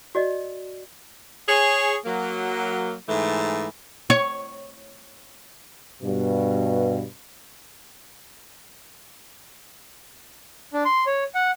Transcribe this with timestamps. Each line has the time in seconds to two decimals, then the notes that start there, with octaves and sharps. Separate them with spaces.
0.15 F#4 D5 D#5
1.49 G#4 C#5
2.05 F#3 A#3
3.08 G#2 E3 A3
4.10 C#5
6.02 G2 B2
10.73 D4
10.85 C6
11.06 C#5
11.35 F#5